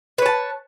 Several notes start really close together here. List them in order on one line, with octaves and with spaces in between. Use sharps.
B4 C#5 A5